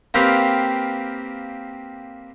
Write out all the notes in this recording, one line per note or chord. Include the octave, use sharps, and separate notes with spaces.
A#3 C4 G4 B4 F5